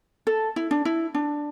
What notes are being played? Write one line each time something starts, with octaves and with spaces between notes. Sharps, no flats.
A4
E4
D4
E4
D4